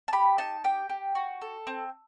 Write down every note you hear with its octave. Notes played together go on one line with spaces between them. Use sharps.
A5
G4 B5
D#4 A5
G4 G5
G4
F#4
A4
C4